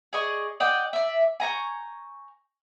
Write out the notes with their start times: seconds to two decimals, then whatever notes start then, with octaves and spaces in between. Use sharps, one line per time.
0.13 G#4 D5 D#5 C#6
0.60 D5 D#5 F#5 G5
0.93 D5 E5
1.40 G#5 A#5 C#6 G6